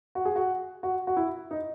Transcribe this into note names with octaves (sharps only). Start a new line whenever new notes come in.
F#4
G#4
F#4
F#4
F#4
E4
D#4